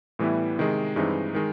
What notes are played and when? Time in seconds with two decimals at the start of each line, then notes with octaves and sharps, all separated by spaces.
0.19 A2 E3 G3 B3 E4
0.58 C3 D#3 G#3
0.96 G2 E3 G#3 C4 D#4
1.35 D#3 G#3